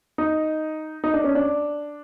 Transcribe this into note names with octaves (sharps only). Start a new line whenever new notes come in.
D#4
D#4
D4
C#4
D4